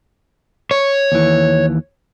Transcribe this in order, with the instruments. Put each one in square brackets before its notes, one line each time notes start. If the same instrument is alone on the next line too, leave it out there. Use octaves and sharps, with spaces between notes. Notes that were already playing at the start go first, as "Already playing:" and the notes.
[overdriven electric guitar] C#5
[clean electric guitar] D#2 E3